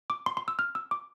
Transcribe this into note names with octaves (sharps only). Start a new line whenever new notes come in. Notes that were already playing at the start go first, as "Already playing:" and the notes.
D6
C6
C6
E6
F6
E6
D6